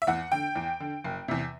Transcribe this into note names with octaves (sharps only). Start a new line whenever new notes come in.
E5
E2 F#5
D3 G5
E2
D3
F#1
E2 C3